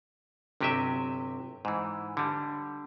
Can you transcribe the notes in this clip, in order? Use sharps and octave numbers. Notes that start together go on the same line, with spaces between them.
G1 C3 F#3 G4 D#5 E5
G#2 E3
D3 G3